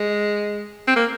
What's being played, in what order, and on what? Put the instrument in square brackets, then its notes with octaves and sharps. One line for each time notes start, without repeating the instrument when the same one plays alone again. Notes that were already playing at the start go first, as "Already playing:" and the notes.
Already playing: [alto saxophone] G#3
C4
A#3